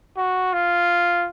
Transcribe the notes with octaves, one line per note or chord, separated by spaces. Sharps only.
F#4
F4